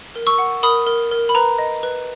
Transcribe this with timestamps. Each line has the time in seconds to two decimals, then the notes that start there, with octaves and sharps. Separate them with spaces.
0.16 A#4
0.27 C#6 E6
0.38 F#5
0.63 A#4 B5 D#6
0.87 A#4
1.11 A#4
1.29 B5
1.35 B4 A#5
1.58 D#5
1.83 B4